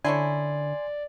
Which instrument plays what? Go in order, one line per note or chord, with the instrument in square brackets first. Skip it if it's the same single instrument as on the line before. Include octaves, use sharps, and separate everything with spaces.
[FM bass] D3 [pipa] C#4 D4 E4 [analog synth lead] D5 [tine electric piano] G#5 C6